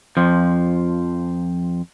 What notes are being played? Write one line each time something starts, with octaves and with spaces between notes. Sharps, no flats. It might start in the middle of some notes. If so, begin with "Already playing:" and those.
F2 F3